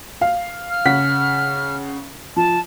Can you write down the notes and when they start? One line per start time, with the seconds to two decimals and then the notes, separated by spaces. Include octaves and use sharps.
0.21 F5
0.70 F6
0.86 C#3 F#5 B6
2.36 F3 A5